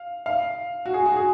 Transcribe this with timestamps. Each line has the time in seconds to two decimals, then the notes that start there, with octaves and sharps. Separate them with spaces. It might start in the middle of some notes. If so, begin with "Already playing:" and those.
Already playing: F5
0.26 F5
0.86 F#4
0.94 G#4
1.06 F#4
1.17 G#4